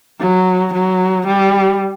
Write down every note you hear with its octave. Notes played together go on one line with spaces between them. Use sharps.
F#3
F#3
G3